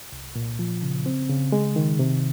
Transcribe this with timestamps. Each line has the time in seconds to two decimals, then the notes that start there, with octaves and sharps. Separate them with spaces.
0.12 C2
0.35 A#2
0.59 F3
0.82 C#3
1.06 C4
1.29 C#3
1.52 G#3
1.76 D#3
1.99 C3